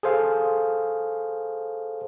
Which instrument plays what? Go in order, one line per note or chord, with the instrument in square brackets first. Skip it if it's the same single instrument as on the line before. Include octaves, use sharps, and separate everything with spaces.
[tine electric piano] G#4 A4 C5 F5